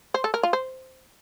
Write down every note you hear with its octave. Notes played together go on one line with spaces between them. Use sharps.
C5
A4
A#4
F4
C5